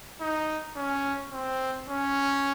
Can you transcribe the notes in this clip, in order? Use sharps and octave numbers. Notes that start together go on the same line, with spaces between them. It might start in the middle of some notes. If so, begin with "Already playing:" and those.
D#4
C#4
C4
C#4